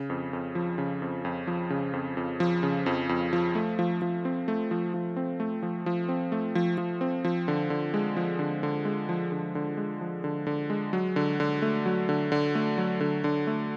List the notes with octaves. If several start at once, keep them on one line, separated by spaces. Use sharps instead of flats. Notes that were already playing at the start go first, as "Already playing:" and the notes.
Already playing: C#3
F2
F2
F3
C#3
F2
F2
F3
C#3
F2
F2
F3
C#3
F2
F2
F3
A3
F3
F3
C4
A3
F3
F3
C4
A3
F3
F3
C4
A3
F3
F3
C4
F3
D3
D3
G#3
F3
D3
D3
G#3
F3
D3
D3
G#3
F3
D3
D3
G#3
F#3
D3
D3
A3
F#3
D3
D3
A3
F#3
D3
D3
A3